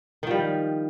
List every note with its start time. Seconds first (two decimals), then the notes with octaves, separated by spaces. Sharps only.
0.23 D#3
0.27 F3
0.31 G3